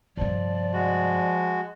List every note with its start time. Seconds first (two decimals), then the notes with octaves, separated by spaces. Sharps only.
0.17 G2 C3 F3 D5
0.74 G#3 F#4